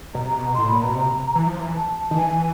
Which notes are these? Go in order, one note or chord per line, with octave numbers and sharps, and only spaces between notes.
B2 A#5
C3
B2
A2 C6
A#2 B5
B2 A#5
C3
E3
F3
E3
A5
D#3
E3 G#5